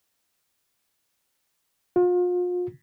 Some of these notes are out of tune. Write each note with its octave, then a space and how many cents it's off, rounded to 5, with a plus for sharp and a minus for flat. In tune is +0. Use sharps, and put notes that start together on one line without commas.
F4 +40